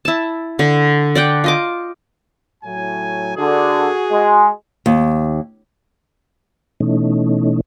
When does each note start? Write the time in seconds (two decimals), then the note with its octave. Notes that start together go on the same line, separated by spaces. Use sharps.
0.05 E4 A5
0.59 D3
1.15 D5 F#5 G5
1.44 F4 D#5 D6
2.64 A2 F#3 G#5
3.37 D3 F#4 G#4
4.11 G#3
4.86 D#2
6.80 B2 E3 A3 C#4 D#4